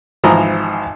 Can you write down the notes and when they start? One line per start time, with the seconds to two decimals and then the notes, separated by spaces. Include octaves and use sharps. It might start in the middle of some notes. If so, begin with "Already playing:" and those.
0.24 G#1 E3 F3 E4 A#5 D#6